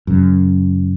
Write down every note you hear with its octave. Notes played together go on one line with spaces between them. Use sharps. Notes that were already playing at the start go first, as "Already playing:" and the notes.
F#2 C#3